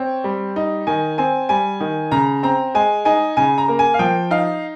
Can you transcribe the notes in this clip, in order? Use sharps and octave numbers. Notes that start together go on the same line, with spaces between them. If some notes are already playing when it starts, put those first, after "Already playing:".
Already playing: C4 C#5
G3
D#4
D#3 G#5
C4 G#5
G3 G#5
D#3
C#3 A#5
C4 A#5
G#3 G#5
D#4 G#5
C#3 G#5
A#5
A#3
G#5
F5
F3 G5
D#4 F5